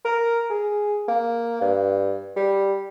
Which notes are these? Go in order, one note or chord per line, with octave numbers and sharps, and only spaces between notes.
A#4
G#4
A#3
G2
G3